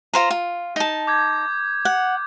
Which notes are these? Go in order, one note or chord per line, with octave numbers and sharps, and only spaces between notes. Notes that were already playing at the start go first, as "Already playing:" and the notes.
F4 C5 A#5
F4
D#4 A5
D6 G6 G#6
F#5